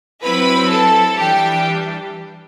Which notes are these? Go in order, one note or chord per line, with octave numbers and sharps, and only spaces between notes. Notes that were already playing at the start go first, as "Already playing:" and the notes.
F#3 C4 E4 B4 B5
A4 A5
E3 G3 D4 G4 G5